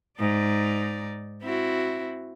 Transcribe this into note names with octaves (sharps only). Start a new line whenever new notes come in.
G#2 D#4 D5
C4 E4 F#4